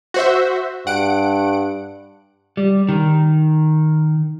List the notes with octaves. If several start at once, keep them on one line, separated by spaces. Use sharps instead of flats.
F#4 C5 E5
G2 F#5 D7
G3
D#3